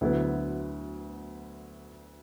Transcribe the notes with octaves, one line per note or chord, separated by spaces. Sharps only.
D2 D3 F#3 B3 E4